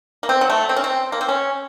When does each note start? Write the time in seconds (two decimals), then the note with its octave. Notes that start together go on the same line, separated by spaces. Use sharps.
0.23 A#3
0.29 C4
0.41 F#3
0.50 A3
0.69 C4
0.76 C#4
0.84 C4
1.12 A#3
1.21 C4
1.29 C#4